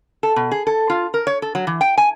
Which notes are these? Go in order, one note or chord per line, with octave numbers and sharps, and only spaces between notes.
A4
B2
G#4
A4
F4
A#4
C#5
A4
F#3
E3
G5
G#5